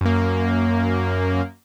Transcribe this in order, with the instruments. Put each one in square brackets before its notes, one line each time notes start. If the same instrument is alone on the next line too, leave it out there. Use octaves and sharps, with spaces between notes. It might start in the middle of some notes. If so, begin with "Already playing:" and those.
[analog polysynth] F#2 A#3